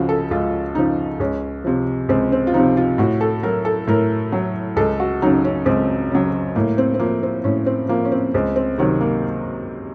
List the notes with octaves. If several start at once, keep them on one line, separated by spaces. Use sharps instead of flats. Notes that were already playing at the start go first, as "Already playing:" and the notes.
Already playing: C#2 C#3 F3 F#4
A4
C#2 F4
C#3 F3 D#4
C#2 C#4
C3 F3
C#2 C4
C4
F4
C3 F3 D#4
F4
A2 F#4
A4
F#3 A#4
A4
A2 A#4
F#3
C#2 A4
F#4
C#3 F#3 D#4
C#4
C#2 C4
C#3 F#3
A2 A#3
C4
C4
F3 A#3
C4
A2 C#4
C4
F3 A#3
C#4
C4
C#2 C4
C4
C3 D#3 F#3
A#3